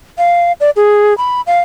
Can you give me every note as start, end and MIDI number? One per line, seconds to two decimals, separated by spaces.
0.18 0.52 77
0.60 0.70 74
0.76 1.16 68
1.18 1.41 83
1.47 1.60 77